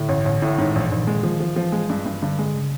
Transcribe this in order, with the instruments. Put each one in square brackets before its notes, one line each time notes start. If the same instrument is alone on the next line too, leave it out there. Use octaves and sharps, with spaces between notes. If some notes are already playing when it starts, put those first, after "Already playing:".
Already playing: [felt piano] A2 [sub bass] D3
[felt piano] A1
A1
A2
[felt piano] G#2 [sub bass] D#3
[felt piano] A#1
[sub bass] E3
[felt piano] A#1
[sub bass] D#3
[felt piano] G#3
[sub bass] D#3 [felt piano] F3
[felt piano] F3
[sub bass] E3 [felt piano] F3
[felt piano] G#3
G2
G2
[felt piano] G2 [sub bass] D3
[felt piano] G#3
[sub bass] C#3